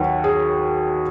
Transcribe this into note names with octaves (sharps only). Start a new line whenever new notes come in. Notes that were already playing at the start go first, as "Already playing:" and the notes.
Already playing: D#2 D#3 F#3 F#4 B4
G#4